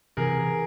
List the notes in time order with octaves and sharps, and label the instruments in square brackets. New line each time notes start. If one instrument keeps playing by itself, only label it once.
[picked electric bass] C3 E3 [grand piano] G#4 A#4